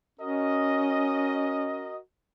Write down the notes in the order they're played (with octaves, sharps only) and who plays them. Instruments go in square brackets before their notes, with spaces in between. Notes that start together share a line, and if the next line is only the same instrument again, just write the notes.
[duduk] C#4 [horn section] F#4 A#4 D#5